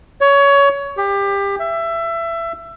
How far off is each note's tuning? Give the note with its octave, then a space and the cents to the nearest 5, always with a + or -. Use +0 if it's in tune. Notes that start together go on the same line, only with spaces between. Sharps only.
C#5 +20
G4 +25
E5 +20